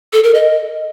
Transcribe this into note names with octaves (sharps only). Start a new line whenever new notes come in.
A4
A#4
D#5